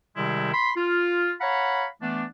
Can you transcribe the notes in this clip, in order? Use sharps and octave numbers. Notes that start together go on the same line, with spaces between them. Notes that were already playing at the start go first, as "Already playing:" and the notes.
C3 D#3 G3 G#3 C4 E4
B5 C6
F4
C#5 F5 F#5 A#5 B5
E3 A3 B3 D4